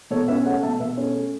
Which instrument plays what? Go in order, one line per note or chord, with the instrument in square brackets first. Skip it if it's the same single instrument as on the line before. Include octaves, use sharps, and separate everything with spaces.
[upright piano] B2 A4 C#5
C#4 B4 E5
A3 C#5 F#5
B2 E5 A5
B2 B4 E5
C#4 A4 C#5
A3